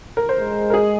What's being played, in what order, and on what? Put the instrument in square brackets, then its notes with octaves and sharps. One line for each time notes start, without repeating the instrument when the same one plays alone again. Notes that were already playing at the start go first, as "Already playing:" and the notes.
[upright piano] A#4
C5
[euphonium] G#3
[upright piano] A#4
G#4